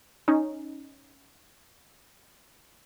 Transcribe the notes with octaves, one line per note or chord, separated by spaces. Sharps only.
C#4 D#4